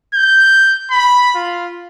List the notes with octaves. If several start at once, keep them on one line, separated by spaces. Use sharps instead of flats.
G6
B5
F4